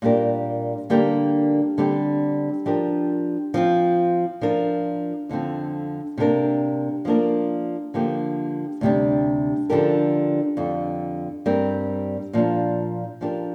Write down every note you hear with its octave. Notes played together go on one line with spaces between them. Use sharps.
A#2 G3 D4 G4 A#4
D3 G3 A#3 G4 A#4
D3 G3 C4 G4
F3 D4 G4 A#4
F3 C4 F4
F3 D4 F4 A#4
F2 D3 F3 C4
C3 A#3 D4 A#4
F3 A#3 D4 A#4
D3 F3 A#3 G4
D2 C3 G3 D4
D3 F3 D4 G4 A#4
F2 D3 G3
G2 G3 C4 A#4
A#2 F3 D4
F3 D4 G4 A#4